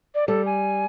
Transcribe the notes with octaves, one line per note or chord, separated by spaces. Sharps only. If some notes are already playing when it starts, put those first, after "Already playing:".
D5
G3 A4
G#5